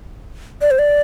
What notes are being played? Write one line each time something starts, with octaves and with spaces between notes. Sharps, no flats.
D5
C5
D5